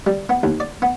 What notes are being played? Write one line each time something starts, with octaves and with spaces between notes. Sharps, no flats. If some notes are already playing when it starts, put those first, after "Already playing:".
G3
B3
D#2
D5
B3